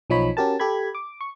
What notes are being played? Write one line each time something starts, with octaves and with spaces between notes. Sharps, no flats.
B1 F3 D#4 C#5 B5
C#4 F#4 G4 A#4 A5
G4 A4 B5 G#6
D6
C#6